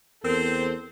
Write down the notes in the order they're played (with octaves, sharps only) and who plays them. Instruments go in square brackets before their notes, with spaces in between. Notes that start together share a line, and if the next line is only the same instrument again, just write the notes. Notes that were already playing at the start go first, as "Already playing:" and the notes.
[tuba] E2 [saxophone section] C4 [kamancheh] A4 C5 [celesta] A#4